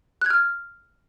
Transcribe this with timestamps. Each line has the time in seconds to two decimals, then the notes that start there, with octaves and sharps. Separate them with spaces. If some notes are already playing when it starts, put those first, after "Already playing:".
0.22 F#6
0.26 G#6
0.30 F6